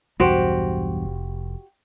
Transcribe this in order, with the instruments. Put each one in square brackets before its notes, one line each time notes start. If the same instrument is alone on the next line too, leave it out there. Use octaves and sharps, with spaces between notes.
[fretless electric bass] B1 E2 G2 [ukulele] F#4 G4 C5
[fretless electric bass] F1